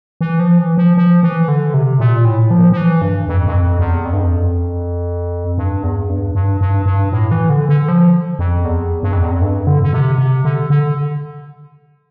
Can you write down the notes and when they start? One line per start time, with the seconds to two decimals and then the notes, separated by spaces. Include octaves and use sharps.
0.21 E3
0.40 F3
0.58 E3
0.78 F3
0.97 F3
1.23 E3
1.48 D3
1.74 C3
2.00 A#2
2.25 A2
2.51 F3
2.72 F3
2.77 E3
3.02 G2
3.28 F2
3.47 G2
3.53 F2
3.79 E2
4.05 F2
4.13 G2
4.20 F2
5.58 G2
5.83 E2
6.10 G2
6.35 G2
6.61 G2
6.86 G2
7.12 A2
7.31 E3
7.50 D3
7.69 D3
7.88 F3
8.39 F2
8.65 E2
9.03 G2
9.13 F2
9.22 E2
9.31 F2
9.42 G2
9.67 D3
9.83 D3
9.93 C3
10.18 C3
10.45 D3
10.70 D3